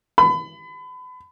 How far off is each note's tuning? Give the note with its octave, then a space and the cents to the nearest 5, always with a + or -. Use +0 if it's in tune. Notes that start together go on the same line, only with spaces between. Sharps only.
B5 +30